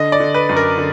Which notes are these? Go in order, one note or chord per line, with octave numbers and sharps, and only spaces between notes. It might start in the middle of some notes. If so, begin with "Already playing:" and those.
Already playing: D3 D#5
D5
D3
B4
F#2
A#4
D3